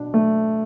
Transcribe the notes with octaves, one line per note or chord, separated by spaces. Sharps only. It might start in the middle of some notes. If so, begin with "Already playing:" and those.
Already playing: B2 D4
A3